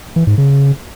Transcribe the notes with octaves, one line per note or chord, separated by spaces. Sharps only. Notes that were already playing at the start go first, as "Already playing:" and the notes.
E3
G#2
C#3